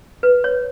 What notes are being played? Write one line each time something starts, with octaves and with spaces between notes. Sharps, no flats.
B4
C#5